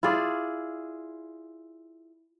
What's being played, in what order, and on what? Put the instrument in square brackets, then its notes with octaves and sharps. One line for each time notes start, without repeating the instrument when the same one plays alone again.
[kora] E4 F4 G#4 D5